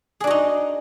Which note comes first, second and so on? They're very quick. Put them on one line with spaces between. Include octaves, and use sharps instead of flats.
G#4 D4 F#4 D#4